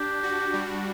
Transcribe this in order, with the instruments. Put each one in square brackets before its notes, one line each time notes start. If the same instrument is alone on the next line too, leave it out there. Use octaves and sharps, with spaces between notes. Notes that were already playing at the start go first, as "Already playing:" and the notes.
Already playing: [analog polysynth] D4 [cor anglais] G4
[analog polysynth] F#4
G3